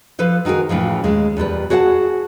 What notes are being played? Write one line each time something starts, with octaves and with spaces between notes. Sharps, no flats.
F3 A4 B4 C5
D#3 D#4 F#4 G#4 A#4
A2 C#3 E3 F3
D#2 G#3
E2 A#2 G3 B4
F#4 G#4 C#5 E5 F#5 A5